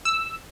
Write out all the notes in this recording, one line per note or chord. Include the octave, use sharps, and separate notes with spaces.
E6